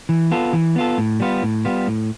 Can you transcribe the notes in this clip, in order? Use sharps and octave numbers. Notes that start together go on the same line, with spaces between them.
E3
B3 F4 A4
E3
B3 F4 A4
A2
G3 B3 F4
A2
G3 B3 F4
A2